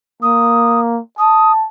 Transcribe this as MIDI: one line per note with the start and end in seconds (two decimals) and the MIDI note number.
0.22 1.01 58
0.22 0.80 87
1.19 1.66 81
1.19 1.52 87